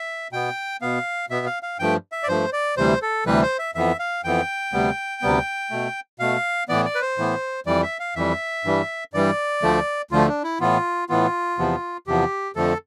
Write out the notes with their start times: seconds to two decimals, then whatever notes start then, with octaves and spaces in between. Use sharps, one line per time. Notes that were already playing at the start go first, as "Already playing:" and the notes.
Already playing: E5
0.33 B2 B3 G5
0.82 B2 B3 F5
1.30 B2 B3 E5
1.46 F5
1.63 F5
1.79 G2 F3 A3 G5
2.12 E5
2.23 D5
2.28 G2 F3 A3 C5
2.53 D5
2.77 D2 C3 E3 G3 C5
3.02 A4
3.26 D2 C3 E3 G3 B4
3.42 C5
3.59 E5
3.75 F2 E3 B3 E5
3.99 F5
4.24 F2 E3 B3 G5
4.73 D2 C3 G3 B3
5.22 D2 C3 G3 B3
5.71 B2 A3
6.20 B2 A3 F5
6.69 A2 E3 B3 D5
6.85 D5
6.95 B4
7.01 C5
7.18 A2 E3 B3
7.66 F2 E3 G3 D5
7.83 E5
8.00 F5
8.16 F2 E3 G3 E5
8.65 G2 E3 G3
9.14 G2 E3 G3 D5
9.62 D2 D3 F3 A3
10.11 D2 D3 F3 A3 F4
10.28 D4
10.44 E4
10.60 A2 E3 B3 F4
11.09 A2 E3 B3 F4
11.59 E2 C3 F3 B3
12.07 E2 C3 F3 B3 G4
12.56 F2 D3 F3 A3 A4